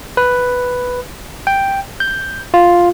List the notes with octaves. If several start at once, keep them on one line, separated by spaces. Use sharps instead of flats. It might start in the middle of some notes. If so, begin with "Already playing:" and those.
B4
G5
G6
F4